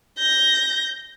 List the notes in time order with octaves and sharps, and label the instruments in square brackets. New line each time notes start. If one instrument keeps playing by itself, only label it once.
[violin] G6 A#6